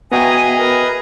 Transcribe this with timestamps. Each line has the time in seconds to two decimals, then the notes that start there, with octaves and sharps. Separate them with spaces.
0.12 B3 F#4 G#4 D#5 E5 G5 G#5 A#5
0.57 A#4 B4